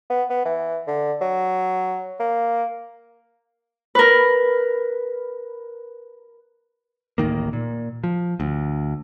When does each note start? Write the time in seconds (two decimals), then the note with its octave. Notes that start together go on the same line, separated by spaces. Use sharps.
0.10 B3
0.30 B3
0.45 E3
0.87 D3
1.21 F#3
2.20 A#3
3.95 A#4 B4
7.18 D1 A1 D#3 A#3
7.53 A#2
8.04 F3
8.40 D2